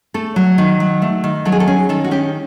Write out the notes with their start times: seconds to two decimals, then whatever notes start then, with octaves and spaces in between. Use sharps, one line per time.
0.14 A3 A4
0.36 F#3
0.58 D#3
0.80 F#3
1.02 A3
1.24 D#3
1.45 F#3 A4
1.52 G#4
1.60 A4
1.67 C#4 G#4
1.89 D#3 A4
2.04 F#4
2.11 C#4 G4